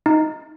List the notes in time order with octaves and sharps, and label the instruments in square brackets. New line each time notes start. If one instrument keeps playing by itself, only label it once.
[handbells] D#4